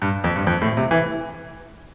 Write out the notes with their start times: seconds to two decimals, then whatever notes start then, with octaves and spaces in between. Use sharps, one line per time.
0.02 G2
0.24 F2
0.36 G2
0.47 F2
0.62 A2
0.77 C3
0.91 E3